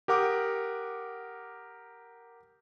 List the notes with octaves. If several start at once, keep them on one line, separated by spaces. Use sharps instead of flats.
G4 A#4 F#5 D6 D#6